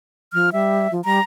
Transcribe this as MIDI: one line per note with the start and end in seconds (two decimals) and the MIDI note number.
0.33 0.49 53
0.33 0.50 89
0.53 0.87 55
0.53 0.91 76
0.92 1.01 53
1.05 1.19 55
1.05 1.23 82